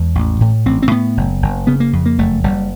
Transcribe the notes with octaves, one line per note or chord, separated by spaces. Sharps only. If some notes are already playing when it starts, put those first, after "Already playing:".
Already playing: E2 G#3
A1
A2
A1 C4
C4
A2 B3
F#1
F#1
C#3 B3
A#3
F2
A#3
F#1 A3
F#1 G3